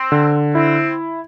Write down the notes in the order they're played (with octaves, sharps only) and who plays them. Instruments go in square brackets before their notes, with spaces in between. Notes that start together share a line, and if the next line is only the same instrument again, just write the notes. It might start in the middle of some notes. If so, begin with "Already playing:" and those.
Already playing: [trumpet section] C4
[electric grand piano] D3
[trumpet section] C4 [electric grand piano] E4